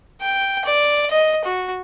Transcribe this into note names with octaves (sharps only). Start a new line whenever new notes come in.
G5
D5
D#5
F#4